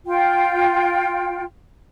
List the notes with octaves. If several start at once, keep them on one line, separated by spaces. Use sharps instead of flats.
F4 G5